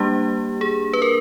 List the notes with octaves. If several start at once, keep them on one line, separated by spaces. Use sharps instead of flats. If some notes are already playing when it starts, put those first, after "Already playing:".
Already playing: G3 A#3 D4 G4
G#4
B4
A#4